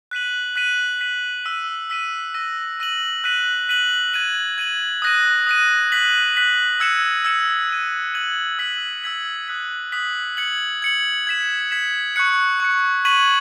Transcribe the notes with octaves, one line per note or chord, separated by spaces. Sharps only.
F#6 B6 D#7 F#7
F#6 B6 D#7 F#7
F#6 B6 D#7 F#7
E6 B6 D#7
E6 B6 D#7
E6 A#6 D#7 F#7
E6 A#6 D#7 F#7
F#6 B6 D#7 F#7
F#6 B6 D#7 F#7
G#6 D#7 F#7
G#6 D#7 F#7
D#6 F#6 A#6 D#7
D#6 F#6 A#6 D#7
F#6 B6 F#7
F#6 B6 F#7
E6 G#6 C#7 E7
E6 G#6 C#7 E7
G#6 D#7 F#7
G#6 D#7 F#7
E6 G#6 B6 F#7
E6 G#6 B6 F#7
D#6 F#6 B6 F#7
D#6 F#6 B6 F#7
G#6 C#7 F#7
G#6 C#7 F#7
G#6 B6 E7
G#6 B6 E7
C#6 F#6 C#7
C#6 F#6 C#7
C#6 G#6 B6 D#7 F#7